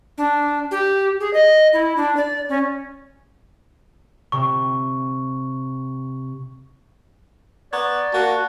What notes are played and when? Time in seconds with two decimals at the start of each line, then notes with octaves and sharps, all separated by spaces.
0.18 D4
0.71 G4
1.20 G#4
1.34 D#5
1.73 E4
1.97 D4
2.17 D5
2.49 C#4
4.32 C3 C#6
7.73 B3 D5 A#5 C#6 G#6
8.13 A#3 F#4 A5